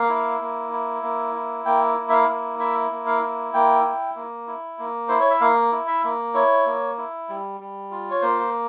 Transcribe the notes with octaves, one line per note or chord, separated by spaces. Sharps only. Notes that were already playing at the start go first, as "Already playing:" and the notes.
Already playing: A#3 F5
E4
A#3
E4
A#3
E4
A#3 G5
E4
E5
F5
A#3
E4 E5
A#3
F5
E4
A#3 G5
E4
A#3
E4
A#3
E4 C5
C#5
E5
A#3 F5
E4
E5
A#3
E4 C#5
A#3
E4
G3
G3
F4
C#5
A#3 C5